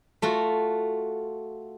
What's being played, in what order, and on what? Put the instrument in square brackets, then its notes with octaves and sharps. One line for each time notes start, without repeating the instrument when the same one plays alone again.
[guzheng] A3 F4 F#4